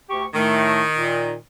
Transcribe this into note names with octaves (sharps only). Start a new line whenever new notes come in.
D2 G4 C#6
A2 D#3 A3
A#2